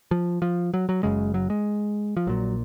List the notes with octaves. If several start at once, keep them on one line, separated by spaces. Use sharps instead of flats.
F3
F3
F#3
F#3
F#1 F#2 C#3 G#3
F#3
G#3
F3
A#1 A#2 F#3